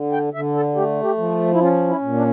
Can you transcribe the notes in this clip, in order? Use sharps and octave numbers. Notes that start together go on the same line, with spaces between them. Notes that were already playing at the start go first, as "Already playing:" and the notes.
Already playing: D3
G5
D3 E5
A4
A3 G4
G4
F3
E4
C#4 F4
E4
A#2
D4